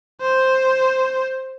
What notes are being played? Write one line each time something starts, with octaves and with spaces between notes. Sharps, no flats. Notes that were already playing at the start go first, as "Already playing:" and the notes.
C5